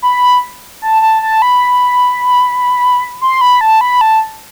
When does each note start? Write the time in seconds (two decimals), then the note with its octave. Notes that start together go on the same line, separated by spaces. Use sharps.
0.02 B5
0.82 A5
1.02 A5
1.22 A5
1.42 B5
3.21 C6
3.41 B5
3.61 A5
3.81 B5
4.01 A5